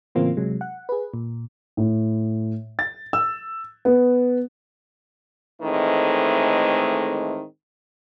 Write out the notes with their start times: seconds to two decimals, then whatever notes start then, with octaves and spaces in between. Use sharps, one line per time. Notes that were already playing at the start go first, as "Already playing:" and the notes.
0.15 A2 C#3 E3 A#3 C4 F4
0.37 C3 F#3 G#3
0.61 F#5
0.89 G#4 B4
1.14 A#2
1.77 A2
2.79 A6
3.13 E6
3.85 B3
5.61 A2 D#3 E3 G#3 A3 C4